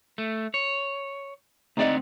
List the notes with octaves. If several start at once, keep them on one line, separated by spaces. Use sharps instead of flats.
A3
C#5
D2 C4 D#4 D5 D#5 F#5